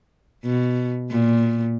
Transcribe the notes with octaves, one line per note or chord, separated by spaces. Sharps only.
B2
A#2